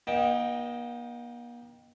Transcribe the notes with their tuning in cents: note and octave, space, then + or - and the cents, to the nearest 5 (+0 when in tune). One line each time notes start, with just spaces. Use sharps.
A#3 +45 D#4 +0 G5 +0